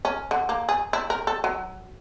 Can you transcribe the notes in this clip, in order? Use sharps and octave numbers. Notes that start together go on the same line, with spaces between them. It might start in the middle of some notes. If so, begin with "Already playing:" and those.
C#4
D3
A#3
G#4
E4
A#4
A4
F#3